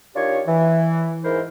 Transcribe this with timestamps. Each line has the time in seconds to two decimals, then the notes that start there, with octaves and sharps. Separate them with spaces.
0.15 D#3 D4 F4 G4 C#5
0.47 E3
1.24 G#2 D#3 E3 E4 A#4 C5